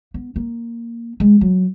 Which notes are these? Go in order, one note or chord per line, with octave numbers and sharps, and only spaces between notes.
B3
A#3
G#3
F#3